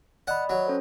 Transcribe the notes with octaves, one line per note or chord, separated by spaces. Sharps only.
D5 D#5 F#5 B5
F#3
C#4 A4 C5